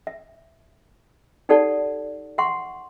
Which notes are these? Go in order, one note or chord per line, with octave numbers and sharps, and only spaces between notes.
E5
D#4 G4 A4 D5 F#5 A5
E5 F#5 C6 C#6